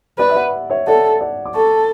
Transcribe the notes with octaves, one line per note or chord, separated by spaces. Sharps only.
B4 D5
E5
D5 F#5
C#5 E5
A4 D5 F#5
D5 F#5
D6
A4 A5 C#6